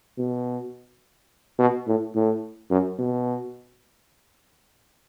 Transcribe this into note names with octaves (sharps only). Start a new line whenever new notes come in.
B2
B2
A2
A2
F#2
B2